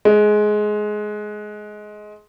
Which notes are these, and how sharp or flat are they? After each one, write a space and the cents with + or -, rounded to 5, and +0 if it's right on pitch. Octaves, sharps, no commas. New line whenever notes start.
G#3 +15